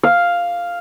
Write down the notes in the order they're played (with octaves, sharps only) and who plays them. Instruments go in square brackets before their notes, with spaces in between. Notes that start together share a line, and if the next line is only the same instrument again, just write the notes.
[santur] F5